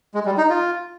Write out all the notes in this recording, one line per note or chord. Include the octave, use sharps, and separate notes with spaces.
G#3
G3
D#4
F4